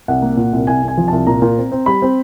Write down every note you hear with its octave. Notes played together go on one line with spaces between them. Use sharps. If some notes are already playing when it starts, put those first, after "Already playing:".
C2 F#5
A#3
A#2
C2
C2 G#5
C2 G#5
F3
C2 A5
A#2 A#5
A#2
C4
C4
G3 B5
C4